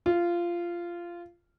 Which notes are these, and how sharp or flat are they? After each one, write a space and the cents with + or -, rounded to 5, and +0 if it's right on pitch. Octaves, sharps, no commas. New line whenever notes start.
F4 -15